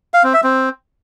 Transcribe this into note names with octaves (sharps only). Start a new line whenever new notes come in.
F5
C4
E5
C4